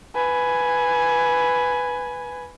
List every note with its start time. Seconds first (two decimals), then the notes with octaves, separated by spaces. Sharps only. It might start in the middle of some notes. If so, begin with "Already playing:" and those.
0.15 B4 G#5